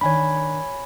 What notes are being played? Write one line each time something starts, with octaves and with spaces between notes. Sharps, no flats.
D#3 D4 C#5 G#5 B5